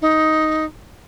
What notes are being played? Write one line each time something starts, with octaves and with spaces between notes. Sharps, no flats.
D#4